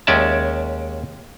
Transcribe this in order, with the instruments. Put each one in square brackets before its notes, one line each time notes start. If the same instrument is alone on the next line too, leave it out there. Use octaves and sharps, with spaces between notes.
[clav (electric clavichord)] D#2 G#3 C#4 D5 E5 A5